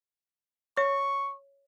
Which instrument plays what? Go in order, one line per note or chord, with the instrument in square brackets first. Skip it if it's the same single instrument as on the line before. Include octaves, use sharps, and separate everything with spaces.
[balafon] C#5 [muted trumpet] C#6